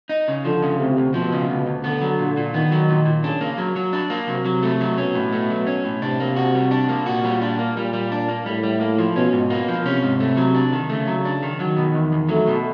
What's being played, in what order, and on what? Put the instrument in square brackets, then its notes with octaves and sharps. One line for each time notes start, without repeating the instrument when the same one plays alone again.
[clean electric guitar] D#4
C#3
[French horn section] D3 [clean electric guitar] F3
[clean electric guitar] C#3
[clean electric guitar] D2 [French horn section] C3
[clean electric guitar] D2
[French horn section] B2 [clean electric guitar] F3
[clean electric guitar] C#3
D2
D2
[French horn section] D3 [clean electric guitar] B3
[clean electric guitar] F#3
A#2
A#2
[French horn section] D#3 [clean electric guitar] B3
[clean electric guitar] F#3
A#2
A#2
[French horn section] C#3 [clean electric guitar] D4
[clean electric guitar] A#3
F#3
F#3
D4
A#3
[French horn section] C3 [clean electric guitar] F#3
[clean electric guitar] F#3
A3
F#3
[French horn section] B2 [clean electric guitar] C#4
[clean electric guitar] A2
A3
F#3
C#4
A2
[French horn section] C3 [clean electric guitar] D4
[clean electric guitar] A#3
F#4
G3
D4
A#3
[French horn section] A#2 [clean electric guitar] F#4
[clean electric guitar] G3
D4
A#3
[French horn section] A#2 [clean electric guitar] G3
[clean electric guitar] G3
D4
A#3
[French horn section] A2 [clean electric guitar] G3
[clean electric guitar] G3
A#3
F3
[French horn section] B2 [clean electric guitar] C#4
[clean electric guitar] G#2
A#3
F3
[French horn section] C3 [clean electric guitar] C#4
[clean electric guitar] G#2
A3
F#3
D4
D#3
[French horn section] C#3 [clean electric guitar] A3
[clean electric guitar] F#3
D4
D#3
[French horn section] D#3 [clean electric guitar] F#3
[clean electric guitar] B2
E2
E2
[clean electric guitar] F#3 [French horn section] A3
[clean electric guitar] B2